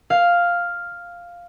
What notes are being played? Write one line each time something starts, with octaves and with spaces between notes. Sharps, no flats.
F5